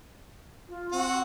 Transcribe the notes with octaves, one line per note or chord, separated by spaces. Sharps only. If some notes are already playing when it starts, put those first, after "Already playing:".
F4
C4 F#4